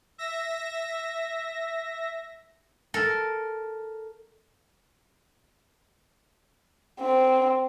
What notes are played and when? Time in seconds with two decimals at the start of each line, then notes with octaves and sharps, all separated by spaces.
0.18 E5 A#6
2.94 A4 A#4
7.01 C4